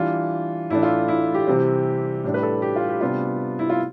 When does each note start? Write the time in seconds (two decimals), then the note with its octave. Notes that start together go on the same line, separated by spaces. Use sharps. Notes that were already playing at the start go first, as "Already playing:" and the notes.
Already playing: E3 G3 D4 F4
0.70 A2 E3 A3 D4 E4
0.83 F4
1.08 E4
1.34 G4
1.47 C3 E3 G3 C4
2.24 A2 G3 D4
2.34 B4
2.43 A4
2.62 G4
2.76 F4
2.89 G4
3.01 C3 G3 B3 D4 F4
3.59 E4
3.69 F4